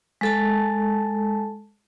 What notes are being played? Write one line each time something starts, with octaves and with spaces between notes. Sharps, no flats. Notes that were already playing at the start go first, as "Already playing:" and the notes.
G#3 A4 A5